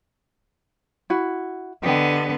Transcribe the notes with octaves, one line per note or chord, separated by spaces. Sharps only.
E4 F#4
D3 B3 G4 D#5 G5